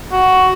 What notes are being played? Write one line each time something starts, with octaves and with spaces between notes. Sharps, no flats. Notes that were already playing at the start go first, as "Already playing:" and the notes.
F#4